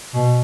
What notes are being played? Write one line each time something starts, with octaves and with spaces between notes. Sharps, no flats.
B2